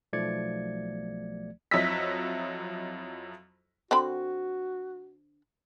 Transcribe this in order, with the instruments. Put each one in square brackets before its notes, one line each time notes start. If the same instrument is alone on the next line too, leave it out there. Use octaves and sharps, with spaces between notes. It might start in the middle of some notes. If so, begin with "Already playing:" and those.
[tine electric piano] B1 F3 A3 D5 G#6 C#7
[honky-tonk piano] F2 F#3 E4 D#5 E6 B6
[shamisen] D3 C4 B5 [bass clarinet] F#4